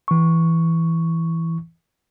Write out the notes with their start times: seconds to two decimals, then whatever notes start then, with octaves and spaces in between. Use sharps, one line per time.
0.08 E3 C#6